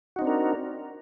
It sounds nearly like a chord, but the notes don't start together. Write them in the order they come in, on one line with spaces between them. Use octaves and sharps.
F#4 D#4 C4 D4 A#4